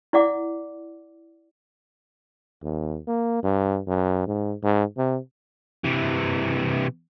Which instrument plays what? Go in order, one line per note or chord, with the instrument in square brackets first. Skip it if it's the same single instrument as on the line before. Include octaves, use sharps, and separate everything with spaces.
[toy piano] E4 D5 F#5 D6
[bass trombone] D#2
A#3
G2
F#2
G#2
G#2
C3
[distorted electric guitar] C3 E3